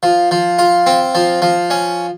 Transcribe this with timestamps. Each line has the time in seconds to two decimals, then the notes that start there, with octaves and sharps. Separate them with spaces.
0.03 F3
0.31 F3
0.59 F4
0.86 C4
1.15 F3
1.42 F3
1.70 C#4